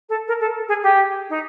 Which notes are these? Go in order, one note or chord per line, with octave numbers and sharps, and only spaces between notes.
A4
A#4
A4
G#4
G4
D#4